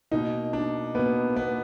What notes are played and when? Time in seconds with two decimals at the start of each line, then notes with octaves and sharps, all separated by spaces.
0.11 B2 A#3 D#4
0.53 D4
0.95 B2 A#3 B3
1.36 B3